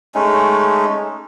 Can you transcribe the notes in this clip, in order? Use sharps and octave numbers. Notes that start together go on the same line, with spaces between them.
G#3 A3 C#4 D#4